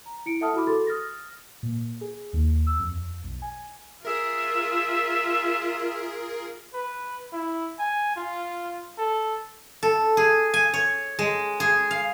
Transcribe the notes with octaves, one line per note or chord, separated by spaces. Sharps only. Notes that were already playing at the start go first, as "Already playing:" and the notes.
A#5
E4 C#7 D7
A4 E5 F#5 A5 D#6 F6
E4 F#4 B5 D6
F#4 G#4 A4 C6 A6
D#6 F6 A6 A#6
A#2
G#4
D#2
E6
F2
B1
G#5
F4 G#4 A#4 E5
B4
E4
G#5
F4
A4
A4
G#4
G#5
C#5
G#3
G#4
F5